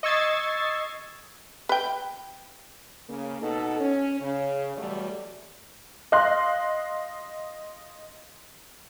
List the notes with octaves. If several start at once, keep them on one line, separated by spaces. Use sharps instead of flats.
D#5 C#6 E6 G#6 A6 C7
B4 G5
C#3 A#3
B2 D#4 A4
C#4
C#3
E2 B2 E3 F#3 G3 A3
D#5 F5 C6 F#6